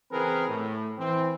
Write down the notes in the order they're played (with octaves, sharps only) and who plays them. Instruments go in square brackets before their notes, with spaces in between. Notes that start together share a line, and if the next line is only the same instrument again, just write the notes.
[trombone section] C#3 E3 C4 G#4 A#4 B4
A2
E3 C4